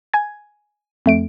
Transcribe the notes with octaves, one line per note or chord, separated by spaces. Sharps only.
G#5 G#6
F2 A3 D7